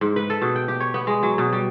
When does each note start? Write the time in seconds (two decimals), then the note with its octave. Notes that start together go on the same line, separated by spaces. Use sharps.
0.01 G#2
0.16 B4
0.30 A4
0.42 B2
0.56 G5
0.68 G4
0.80 C#5
0.94 B3
1.07 G#3
1.23 F#3
1.38 B2
1.53 G3